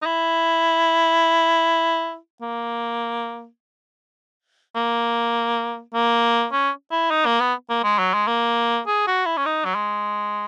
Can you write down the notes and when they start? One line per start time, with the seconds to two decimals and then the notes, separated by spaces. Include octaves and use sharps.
0.02 D#4
0.06 E4
2.41 A#3
4.75 A#3
5.94 A#3
6.52 C#4
6.91 E4
7.10 D#4
7.26 A#3
7.40 B3
7.69 A#3
7.83 G#3
7.98 F#3
8.13 G#3
8.27 A#3
8.87 G#4
9.07 F#4
9.26 E4
9.37 C#4
9.45 D#4
9.65 F#3
9.75 G#3